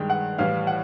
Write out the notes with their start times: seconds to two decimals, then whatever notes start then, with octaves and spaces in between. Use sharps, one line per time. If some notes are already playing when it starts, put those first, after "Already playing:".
Already playing: G2 D#3 G#3 G5
0.10 F#5
0.38 A2 E3 G3 F5
0.67 F#5